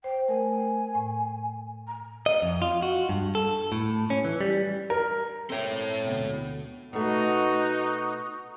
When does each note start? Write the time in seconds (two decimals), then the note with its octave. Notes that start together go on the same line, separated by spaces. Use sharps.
0.04 C5 G5
0.28 A3 A#4 G#5
0.95 A2
1.87 A#5
2.26 D#5
2.42 F2
2.62 F4
2.82 F#4
3.09 G2
3.35 A4
3.72 A2
4.10 C#4
4.25 E3
4.41 G3
4.90 A#4
5.50 C4 A4 C#5 E5 G5
6.07 D2 B2
6.93 B2 A3 D#4 F#4